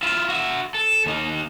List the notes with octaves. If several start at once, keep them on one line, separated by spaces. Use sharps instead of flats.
E4 F4
F#4 E5
A4
D#2 D#4